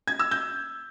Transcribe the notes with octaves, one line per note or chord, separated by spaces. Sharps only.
G#6
E6
G6